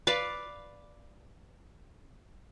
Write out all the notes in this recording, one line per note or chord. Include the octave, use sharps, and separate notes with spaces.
B4 D5 F5